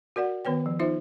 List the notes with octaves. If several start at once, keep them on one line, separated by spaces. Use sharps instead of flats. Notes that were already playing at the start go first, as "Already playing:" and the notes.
F#4 A#4 D5 F#5
D#3 B3 B4 C#5 G5
F3
D#4 F4 C5 E5